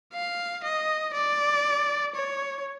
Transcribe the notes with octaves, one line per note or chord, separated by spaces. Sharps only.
F5
D#5
D5
C#5